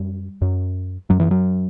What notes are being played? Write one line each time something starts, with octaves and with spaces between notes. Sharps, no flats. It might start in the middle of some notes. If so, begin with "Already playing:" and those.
Already playing: F#2 G3
F#2
F#2 F#3
E3
F#3